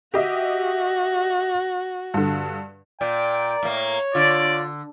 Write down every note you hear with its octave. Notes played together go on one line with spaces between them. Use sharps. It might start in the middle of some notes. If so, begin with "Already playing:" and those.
F#4 G4 D#5 E5
G2 D3
A#2 D5 G5
A2 A#3 C#5
D3 F4 D5